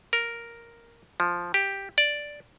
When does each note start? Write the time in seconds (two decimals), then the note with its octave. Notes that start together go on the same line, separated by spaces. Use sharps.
0.13 A#4
1.20 F3
1.54 G4
1.98 D5